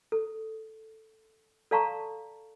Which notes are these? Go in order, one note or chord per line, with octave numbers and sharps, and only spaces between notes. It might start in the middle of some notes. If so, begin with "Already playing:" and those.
A4
A4 D5 F5 A5 A#5 C#6